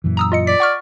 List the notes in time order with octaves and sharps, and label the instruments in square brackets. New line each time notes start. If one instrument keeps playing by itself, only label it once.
[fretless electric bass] F#2 A#2 E3
[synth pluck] A#5 D#6 E6
F4 D#5 C#7
[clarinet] D5 [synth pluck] B6
[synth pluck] F#5 C#6 F6